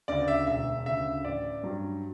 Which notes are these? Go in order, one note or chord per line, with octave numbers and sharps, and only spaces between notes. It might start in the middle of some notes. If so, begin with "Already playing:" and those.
D2 C#3 D5
E5
E1 E5
D2 C#3 E5
A1 D5
G2 F#3